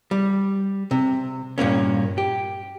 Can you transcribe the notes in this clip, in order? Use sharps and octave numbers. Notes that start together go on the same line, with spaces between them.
G3
C3
G2 A#2 A#3 C#4
G4